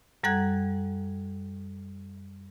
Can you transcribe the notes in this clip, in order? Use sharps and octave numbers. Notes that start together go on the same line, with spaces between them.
F#2 G3 A4 F#5 F#6 G#6